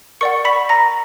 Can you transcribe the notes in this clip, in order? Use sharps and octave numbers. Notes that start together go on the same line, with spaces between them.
A#4 D5 F#5 C#6 C#7
B5 B6
A#5 A#6